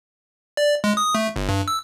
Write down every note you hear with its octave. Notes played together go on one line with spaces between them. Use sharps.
D5
G#3
D#6
A3
G1
G2
E6